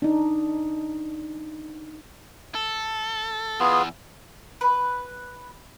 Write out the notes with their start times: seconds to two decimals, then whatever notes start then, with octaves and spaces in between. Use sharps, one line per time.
0.02 D4 D#4
2.55 A4
3.60 E2 B3 F4 G#4
4.61 B4